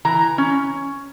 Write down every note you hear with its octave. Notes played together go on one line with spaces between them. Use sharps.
E3 A#5
C#4